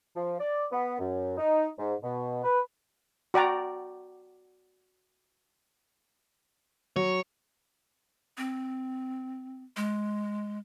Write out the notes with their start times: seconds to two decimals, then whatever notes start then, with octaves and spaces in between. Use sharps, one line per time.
0.16 F3
0.39 D5
0.71 B3
0.99 F#2
1.38 D#4
1.78 G#2
2.03 B2
2.44 B4
3.34 F#4 D5 G5 A#5
6.96 F#3 C#5
8.38 C4
9.77 G#3